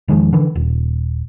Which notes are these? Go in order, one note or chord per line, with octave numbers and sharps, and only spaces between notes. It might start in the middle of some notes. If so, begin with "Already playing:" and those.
E1 D#3 F3 G#3
D3 E3
D#1